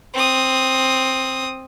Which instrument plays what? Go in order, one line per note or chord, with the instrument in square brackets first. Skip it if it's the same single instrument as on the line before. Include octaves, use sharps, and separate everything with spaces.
[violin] C4 D#6